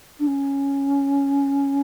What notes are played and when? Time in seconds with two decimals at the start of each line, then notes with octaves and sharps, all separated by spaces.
0.19 D4
0.27 C#4